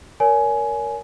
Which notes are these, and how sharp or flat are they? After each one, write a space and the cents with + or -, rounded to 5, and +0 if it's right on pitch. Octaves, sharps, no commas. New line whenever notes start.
A#4 +0 C#5 +35 G#5 +15